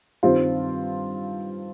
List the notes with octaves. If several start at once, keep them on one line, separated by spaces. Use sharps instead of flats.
G2 D#3 G3 C4 F4